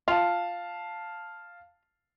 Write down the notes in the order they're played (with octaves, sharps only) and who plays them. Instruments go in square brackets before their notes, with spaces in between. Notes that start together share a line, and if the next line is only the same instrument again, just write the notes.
[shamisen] F4 [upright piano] F5 A5